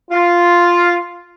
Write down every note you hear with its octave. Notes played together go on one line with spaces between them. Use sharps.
F4